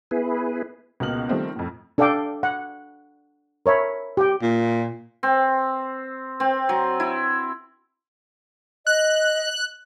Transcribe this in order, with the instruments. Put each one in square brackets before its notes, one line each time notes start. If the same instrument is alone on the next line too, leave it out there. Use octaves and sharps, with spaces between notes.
[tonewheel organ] B3 E4 G#4 B4
[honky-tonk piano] C#2 B2 A#3 F6 F#7
D#3 F3 G3 A3 C4
F2 A2
[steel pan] D4 A4 D5 F5 G5 D6
F#5
A#4 C#5 E5 B5
G4 G5
[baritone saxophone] A#2
[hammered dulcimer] C4
C4
F#3
E4
[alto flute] D#5 [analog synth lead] F#6